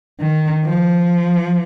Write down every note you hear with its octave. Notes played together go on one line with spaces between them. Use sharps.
D#3
F3